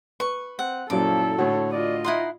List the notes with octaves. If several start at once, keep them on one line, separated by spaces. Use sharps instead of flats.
B4 C#6
C4 F#5
F#2 A#2 F3 F#3 E4 A4 D6
A2 D3 F#4 C#5
F4 D5 D#5
D#4 E4 F#5 C6